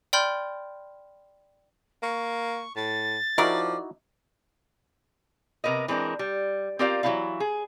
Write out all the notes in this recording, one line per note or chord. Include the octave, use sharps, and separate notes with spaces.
D5 G5 B5 C6 F6 G6
A#3 C#6
A2 A6
F3 D#4 E4 F#4 A#4 D5
C3 A#4 B4 D#5
E3 G#3 C4 D4 A#4
G3
C4 F4 G4 A#4 D5 F5
E3 F#3 C4 D#4 E4 F5
G#4